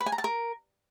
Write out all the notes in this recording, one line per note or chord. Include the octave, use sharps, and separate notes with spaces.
B4
G#5
A#5
A5
A#4